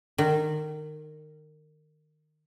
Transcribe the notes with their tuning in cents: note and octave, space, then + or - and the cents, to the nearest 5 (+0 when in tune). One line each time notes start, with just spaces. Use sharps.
D#3 -25